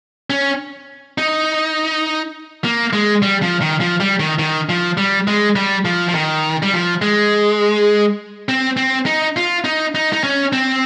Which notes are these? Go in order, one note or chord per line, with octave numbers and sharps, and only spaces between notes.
C#4
D#4
A#3
G#3
G3
F3
D#3
F3
G3
D#3
D#3
F3
G3
G#3
G3
F3
F3
D#3
G3
F3
G#3
C4
C4
D#4
F4
D#4
D#4
D#4
C#4
C4